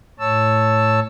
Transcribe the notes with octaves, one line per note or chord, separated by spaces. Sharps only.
A2 C#5 A5 E6